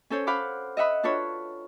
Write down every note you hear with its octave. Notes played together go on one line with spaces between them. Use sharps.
C#4 A4 C5 C#5
C5 F5 F#5 B5 D6
D#5 E5 F#5 B5 D#6
D4 F4 A4 B4 C#5